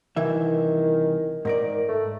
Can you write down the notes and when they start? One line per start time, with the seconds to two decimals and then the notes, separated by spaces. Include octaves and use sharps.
0.17 C2 D#3 E3 E5
1.45 G#2 D#3 A#4 D5
1.88 A3